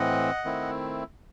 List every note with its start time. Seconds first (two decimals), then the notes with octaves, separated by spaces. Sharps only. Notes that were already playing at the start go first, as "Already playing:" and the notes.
Already playing: A2 E3 C4 D#5 F#5
0.45 D#3 A3 C4 E4